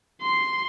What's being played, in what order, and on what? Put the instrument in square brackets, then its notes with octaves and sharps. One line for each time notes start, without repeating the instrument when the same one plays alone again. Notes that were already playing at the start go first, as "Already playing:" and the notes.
[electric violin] C6